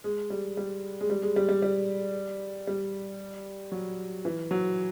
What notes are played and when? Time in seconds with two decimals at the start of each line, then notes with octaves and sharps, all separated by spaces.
0.04 G#3
0.30 G3
0.57 G3
1.01 G#3
1.10 G3
1.23 G#3
1.36 G3
1.49 G3
1.62 G3
2.67 G3
3.72 F#3
4.25 E3
4.51 F#3